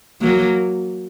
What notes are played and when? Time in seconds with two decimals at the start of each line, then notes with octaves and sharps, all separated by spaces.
0.21 F#3 A#3